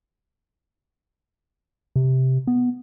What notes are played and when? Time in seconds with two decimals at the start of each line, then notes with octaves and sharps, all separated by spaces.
1.96 C3
2.47 B3